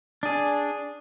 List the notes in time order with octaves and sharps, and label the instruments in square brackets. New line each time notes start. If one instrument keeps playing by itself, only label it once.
[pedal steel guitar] D4 G#4